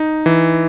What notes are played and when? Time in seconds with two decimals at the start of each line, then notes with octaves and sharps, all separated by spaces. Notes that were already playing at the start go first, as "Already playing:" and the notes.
Already playing: D#4
0.26 E3